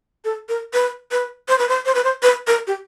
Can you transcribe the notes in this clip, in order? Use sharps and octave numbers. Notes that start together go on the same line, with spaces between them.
A4
A#4
B4
B4
C5
B4
C5
C5
B4
C5
B4
A#4
G4